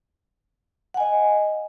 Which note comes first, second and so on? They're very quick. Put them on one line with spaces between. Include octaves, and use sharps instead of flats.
F#5 G#5 D#5